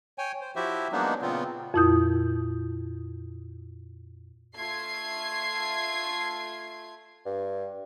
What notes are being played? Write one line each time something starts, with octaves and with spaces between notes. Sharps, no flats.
C#5 G5 G#5
C5
F3 E4 F#4 G4 C5 E5
F#3 G#3 A#3 B3 D4 D#4
A#2 C#3 B3 C4 F4
F2 A#2 E4 D#6 G6
A3 F4 G#6 C7
G2